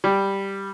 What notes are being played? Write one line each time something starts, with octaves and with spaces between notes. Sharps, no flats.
G3